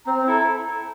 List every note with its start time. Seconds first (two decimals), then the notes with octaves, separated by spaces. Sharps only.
0.06 C4 A#5
0.27 E4 A4